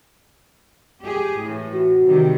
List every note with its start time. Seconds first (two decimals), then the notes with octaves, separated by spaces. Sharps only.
1.03 G4 G#4
1.40 A2 E3
1.74 F#4
2.06 C3 D#3 G3